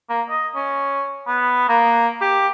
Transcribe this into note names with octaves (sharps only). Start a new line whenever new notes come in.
A#3
D#5
C#4
B3
A#3
G4